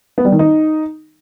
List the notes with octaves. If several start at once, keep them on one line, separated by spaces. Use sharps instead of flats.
B3
G3
D#3
D#4